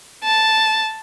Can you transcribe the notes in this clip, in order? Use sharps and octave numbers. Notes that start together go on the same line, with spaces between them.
A5